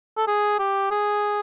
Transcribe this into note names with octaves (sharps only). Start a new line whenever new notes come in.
A4
G#4
G4
G#4